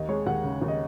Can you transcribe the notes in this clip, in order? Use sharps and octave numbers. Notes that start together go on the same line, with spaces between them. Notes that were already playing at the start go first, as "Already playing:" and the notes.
Already playing: D#2 D#5
G#3 C#5
D#2 F#5
C#3
D#2
D#5